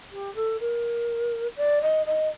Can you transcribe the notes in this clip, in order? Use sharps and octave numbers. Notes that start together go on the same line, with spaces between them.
G4
A4
A#4
D5
D#5
D#5